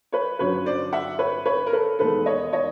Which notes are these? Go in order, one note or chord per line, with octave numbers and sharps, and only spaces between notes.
B4 C#5
G1 F#2 D3 F#3 B4 C#5
C5 D5
E5 F#5
B4 C#5
B4 C#5
A#4
A4 B4
E1 D#2 D#3 G#3 B3 A4 B4
C#5 D#5
C#5 D#5